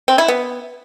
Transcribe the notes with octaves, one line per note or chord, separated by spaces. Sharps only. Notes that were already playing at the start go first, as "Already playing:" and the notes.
C4
E4
B3